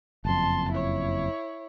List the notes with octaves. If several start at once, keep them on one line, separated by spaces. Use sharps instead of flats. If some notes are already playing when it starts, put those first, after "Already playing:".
F#1 F2 A5 C6
E4 C#5